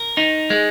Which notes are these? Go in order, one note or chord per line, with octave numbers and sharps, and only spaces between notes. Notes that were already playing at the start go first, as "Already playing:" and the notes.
Already playing: A#4
D#4
G#3